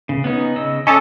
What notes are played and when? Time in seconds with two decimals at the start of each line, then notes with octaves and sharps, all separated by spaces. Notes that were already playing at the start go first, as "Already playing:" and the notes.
0.09 C#3
0.24 B3 C#4 D#4
0.56 C#3 D#5 E6
0.87 C#4 A4 D#5 D6 D#6